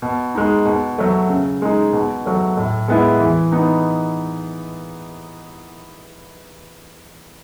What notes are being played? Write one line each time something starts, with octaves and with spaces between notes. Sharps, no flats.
B2
G#3 D#4
B2
F#3 A3
C#3
G#3 D#4
B2
F#3 A3
A2
G#3 B3 E4
E3
B3 D#4